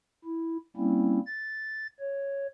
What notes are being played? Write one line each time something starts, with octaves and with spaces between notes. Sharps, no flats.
E4
G3 A#3 C4 C#4 E4
A6
C#5